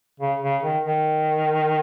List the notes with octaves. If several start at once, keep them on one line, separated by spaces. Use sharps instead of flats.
C#3
C#3
D#3
D#3